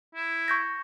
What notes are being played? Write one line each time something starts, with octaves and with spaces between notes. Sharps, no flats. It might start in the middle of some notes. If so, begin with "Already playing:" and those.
E4
C#6 G6 A#6